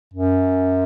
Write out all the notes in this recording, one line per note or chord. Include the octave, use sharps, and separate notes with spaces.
F#2